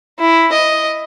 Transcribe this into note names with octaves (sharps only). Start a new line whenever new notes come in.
E4
D#5